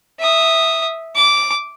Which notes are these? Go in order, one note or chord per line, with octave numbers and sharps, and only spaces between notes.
E5 D#6
D6